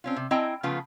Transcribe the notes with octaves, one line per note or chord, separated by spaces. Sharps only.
C4 C#4 F4
C3
C4 E4 D#5 G5 G#5 A#5
C#3 F3 A3 B3 F4 B4